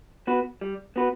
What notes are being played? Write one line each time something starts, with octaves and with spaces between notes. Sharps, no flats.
B3 F#4 B4
G3
B3 F#4 B4